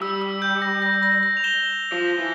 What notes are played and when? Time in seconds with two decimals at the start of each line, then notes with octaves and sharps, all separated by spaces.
0.01 G3 E6
0.22 E6
0.42 G6
0.62 A#6
0.82 A#6
1.03 A#6
1.23 A#6
1.37 F7
1.44 E7 G7
1.92 F3
2.19 E3